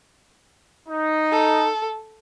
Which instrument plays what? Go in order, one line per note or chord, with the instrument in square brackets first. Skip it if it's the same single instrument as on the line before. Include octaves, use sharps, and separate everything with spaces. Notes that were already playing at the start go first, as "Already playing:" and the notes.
[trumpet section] D#4
[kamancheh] A4